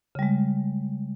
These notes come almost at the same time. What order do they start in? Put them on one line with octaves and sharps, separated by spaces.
C#3 G3 G#3